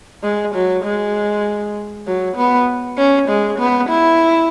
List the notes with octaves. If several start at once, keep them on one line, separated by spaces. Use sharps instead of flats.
G#3
F#3
G#3
F#3
B3
C#4
G#3
B3
E4